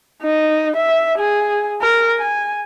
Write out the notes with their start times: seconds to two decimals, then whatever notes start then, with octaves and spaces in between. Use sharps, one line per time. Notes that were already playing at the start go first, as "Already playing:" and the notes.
0.23 D#4
0.76 E5
1.18 G#4
1.81 A#4
2.18 G#5